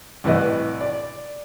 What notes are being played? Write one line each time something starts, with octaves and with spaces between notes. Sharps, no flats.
C2 A2 E3 B4 D5 D#5
D5